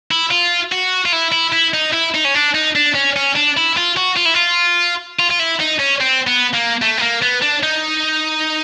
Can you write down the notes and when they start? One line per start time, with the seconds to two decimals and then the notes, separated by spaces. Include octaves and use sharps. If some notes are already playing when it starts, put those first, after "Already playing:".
0.11 E4
0.31 F4
0.72 F#4
1.06 F4
1.13 E4
1.32 E4
1.53 E4
1.74 D#4
1.93 E4
2.14 D#4
2.24 C#4
2.34 D4
2.55 D#4
2.76 D4
2.95 C#4
3.16 C#4
3.35 D4
3.57 E4
3.77 F4
3.97 F#4
4.17 F4
4.26 E4
4.34 F4
5.19 F4
5.31 F4
5.39 E4
5.60 D#4
5.79 C#4
6.00 C4
6.27 B3
6.54 A#3
6.82 A3
6.98 B3
7.02 A#3
7.22 B3
7.42 D4
7.63 D#4